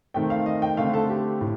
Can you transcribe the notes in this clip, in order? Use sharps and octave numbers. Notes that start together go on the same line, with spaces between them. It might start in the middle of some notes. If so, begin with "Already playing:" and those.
D#3 A3 C4 G5
F5
D#5
G5
D3 A3 C4 F5
A4
G4
A2